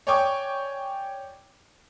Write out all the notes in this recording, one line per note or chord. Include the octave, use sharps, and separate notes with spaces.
C#5 D5 G5 G#5 C#6 D6